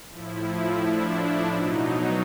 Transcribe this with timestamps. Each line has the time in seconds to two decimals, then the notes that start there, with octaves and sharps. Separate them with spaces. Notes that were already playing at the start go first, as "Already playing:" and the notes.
0.11 A2 F3 E4
0.79 D4
1.14 E4
1.47 B2 F#3 D#4